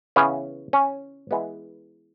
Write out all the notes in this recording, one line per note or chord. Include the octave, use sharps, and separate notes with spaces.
C#3 E3 B3 C#4
C#4
E3 G#3 B3